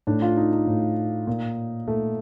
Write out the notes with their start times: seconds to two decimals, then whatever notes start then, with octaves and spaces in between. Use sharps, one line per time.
0.07 A2 D4
0.22 F4
0.37 D#4
0.52 D#4
0.67 A2
1.27 A#2
1.87 A#2 A3